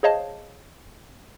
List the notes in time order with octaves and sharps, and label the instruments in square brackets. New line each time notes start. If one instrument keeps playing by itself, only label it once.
[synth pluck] G#4 C5 C#5 D#5 F5 A5